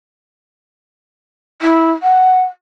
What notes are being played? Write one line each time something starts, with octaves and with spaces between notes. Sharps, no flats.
E4
F#5